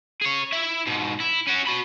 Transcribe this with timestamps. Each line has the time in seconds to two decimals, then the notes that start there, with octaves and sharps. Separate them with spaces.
0.21 G#4 C#5
0.53 E4 E5
0.87 G#2 B2
1.20 E4
1.47 C#4 F#4
1.67 F#4 B5